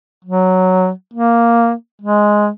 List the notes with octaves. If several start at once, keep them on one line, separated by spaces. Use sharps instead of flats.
F#3
A#3
G#3